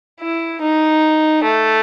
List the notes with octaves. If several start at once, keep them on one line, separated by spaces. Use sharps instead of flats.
E4
D#4
A3